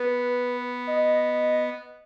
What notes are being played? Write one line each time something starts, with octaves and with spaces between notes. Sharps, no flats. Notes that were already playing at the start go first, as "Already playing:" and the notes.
Already playing: B3 B4
D#5